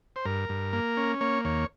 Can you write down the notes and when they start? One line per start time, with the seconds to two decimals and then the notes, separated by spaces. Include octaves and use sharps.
0.16 C5
0.25 G2 A#4
0.49 G2
0.73 A#3
0.97 C#4
1.21 A#3 C#5
1.45 D#2 C#5